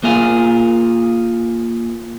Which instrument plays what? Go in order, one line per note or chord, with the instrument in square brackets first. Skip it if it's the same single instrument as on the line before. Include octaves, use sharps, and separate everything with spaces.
[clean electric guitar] A#3 F4 G#4 F5